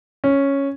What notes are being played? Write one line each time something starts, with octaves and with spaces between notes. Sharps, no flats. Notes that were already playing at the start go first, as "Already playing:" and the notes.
C#4